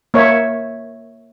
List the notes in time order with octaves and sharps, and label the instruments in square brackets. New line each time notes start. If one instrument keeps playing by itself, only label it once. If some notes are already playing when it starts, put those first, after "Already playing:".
[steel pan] A#3 C#5 E5